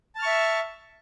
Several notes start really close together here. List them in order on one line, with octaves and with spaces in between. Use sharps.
A5 F6 C#6 E5